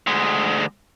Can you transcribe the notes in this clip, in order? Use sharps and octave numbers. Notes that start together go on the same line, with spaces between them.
D2 G#3